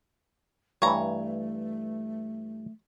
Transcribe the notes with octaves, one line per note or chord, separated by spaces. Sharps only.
G2 E3 A3 C#5 A#5